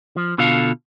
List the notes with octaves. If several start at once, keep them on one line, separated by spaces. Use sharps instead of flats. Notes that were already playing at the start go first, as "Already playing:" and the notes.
F3
B2 D3 F4 A4 F5